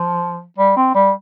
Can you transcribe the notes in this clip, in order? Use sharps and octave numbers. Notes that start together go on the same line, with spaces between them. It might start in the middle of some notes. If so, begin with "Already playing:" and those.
Already playing: F3
G3
C4
G3